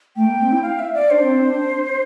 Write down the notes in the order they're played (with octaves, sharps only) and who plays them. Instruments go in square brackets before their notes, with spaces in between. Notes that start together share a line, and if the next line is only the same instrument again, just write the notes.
[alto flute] A3 [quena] G5
[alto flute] A#3
C4
E4
[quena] F5
E5
D5
[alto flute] D4 [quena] C5
[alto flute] C4
C4
D4